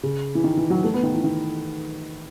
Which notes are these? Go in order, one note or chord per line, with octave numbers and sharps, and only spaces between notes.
C#3
E3
D#3
E3
F#3
A3
B3
D#3
E3
D#3